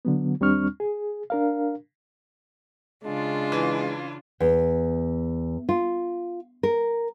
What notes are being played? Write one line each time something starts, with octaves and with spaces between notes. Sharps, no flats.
D3 F#3 B3
D#2 G3 C4 D4 C#6 F6
G#4
D4 A#4 F5
C#3 G#3 D4 F4
E3
E2
F4
A#4